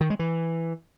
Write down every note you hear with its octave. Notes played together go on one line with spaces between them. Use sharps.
D#3
G#3
E3